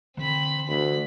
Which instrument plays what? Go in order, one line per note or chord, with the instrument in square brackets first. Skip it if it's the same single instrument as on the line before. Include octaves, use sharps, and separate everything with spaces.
[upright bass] D3 E3 [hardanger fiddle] C4 B5
[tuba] D2 [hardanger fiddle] B5